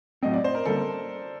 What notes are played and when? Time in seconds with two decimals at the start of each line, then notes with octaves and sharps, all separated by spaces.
0.23 A2 F#3 A3 C4 D#5
0.33 D5
0.44 C5
0.55 A#4
0.65 D3 G3 A#3 A4